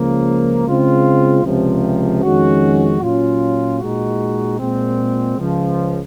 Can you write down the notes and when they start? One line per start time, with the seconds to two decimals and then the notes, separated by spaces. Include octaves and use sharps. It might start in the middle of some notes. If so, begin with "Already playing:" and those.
Already playing: C#2 C#3 F3 A#3
0.65 C#3 G#3 C4 F4
1.44 C#2 C3 F3
2.22 F2 D#3 G#3 C#4 F#4
3.01 A#2 F#3 C#4 F4
3.80 A#2 G#3 D#4 F#4
4.59 A#2 G#3 C4
5.37 C#2 C#3 F3